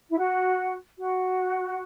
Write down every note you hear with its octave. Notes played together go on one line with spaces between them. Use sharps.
E4
F#4
F#4